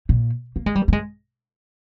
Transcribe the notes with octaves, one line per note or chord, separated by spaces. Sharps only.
A#2
A#3
G#3
G3
A#3
G#3